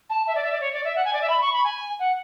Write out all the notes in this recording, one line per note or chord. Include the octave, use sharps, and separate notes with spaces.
A5
E5
D5
E5
D5
C#5
D5
E5
F#5
G#5
D5
E5
B5
C#6
B5
G#5
F#5